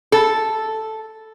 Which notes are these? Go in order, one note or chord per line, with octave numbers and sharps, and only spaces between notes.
A4